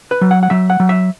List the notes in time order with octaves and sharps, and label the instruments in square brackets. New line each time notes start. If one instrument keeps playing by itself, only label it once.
[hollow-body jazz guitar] B4
F#3
F#5
F#5
F#3 E5
F#5
F#3
E5